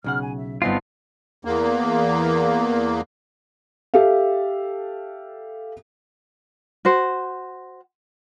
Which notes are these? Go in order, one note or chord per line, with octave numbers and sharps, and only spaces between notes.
B1 C#3 F#5 F6
G#5
E5
G1 B3 C4 D#4 F4 A5 C6
E2 A#3
G4 A4 E5 F5
F#4 C5